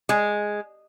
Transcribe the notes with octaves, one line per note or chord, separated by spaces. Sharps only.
G#3